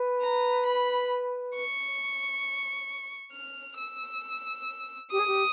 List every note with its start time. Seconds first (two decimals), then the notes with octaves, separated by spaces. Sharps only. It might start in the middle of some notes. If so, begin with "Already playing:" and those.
Already playing: B4
0.21 A#5
0.66 B5
1.55 C#6
3.33 F6
3.78 E6
5.11 G4 D#6
5.19 G#4
5.27 G4